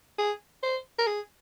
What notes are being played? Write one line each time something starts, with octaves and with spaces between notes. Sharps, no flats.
G#4
C5
A#4
G#4